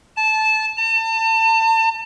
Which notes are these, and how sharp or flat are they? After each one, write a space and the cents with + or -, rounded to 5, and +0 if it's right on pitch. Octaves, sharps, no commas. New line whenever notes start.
A5 -15
A5 +35